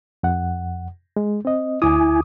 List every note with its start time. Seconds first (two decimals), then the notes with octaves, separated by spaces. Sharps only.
0.23 F2 F#5
1.17 G#3
1.45 C4 D#5
1.82 D2 E4 G#5 D6 D#6